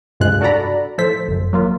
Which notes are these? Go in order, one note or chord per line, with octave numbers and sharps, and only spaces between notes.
C#2 G2 C3 G#3 F4 F#6
D4 F#4 A4 D5 A#5 B5
A2 F3 A4 C5 B6
G1 F#2
F#3 A#3 F4